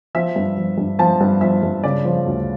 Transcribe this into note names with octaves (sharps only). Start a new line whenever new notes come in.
F3 E5
G2
F3
G2
F3 A5
G2
F3 E5
G2
C#3 D5
F3
D2